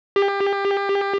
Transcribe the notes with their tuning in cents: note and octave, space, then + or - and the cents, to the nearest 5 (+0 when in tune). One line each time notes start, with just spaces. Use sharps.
G4 +25